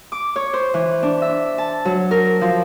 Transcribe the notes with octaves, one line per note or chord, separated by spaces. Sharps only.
D6
C#5
C5
E3
D4
E5
A5
F#3
A#4
F3